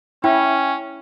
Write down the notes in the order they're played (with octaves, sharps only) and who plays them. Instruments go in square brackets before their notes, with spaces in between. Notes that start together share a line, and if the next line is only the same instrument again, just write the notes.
[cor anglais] C#4 [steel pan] E4 [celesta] G5